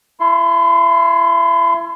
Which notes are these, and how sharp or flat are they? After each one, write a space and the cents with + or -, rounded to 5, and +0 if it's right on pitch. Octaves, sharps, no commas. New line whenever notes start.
E4 +35 C6 +0